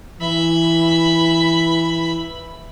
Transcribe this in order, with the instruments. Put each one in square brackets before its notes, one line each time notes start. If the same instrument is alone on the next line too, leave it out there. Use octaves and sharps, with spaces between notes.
[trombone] E3 [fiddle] E5 B5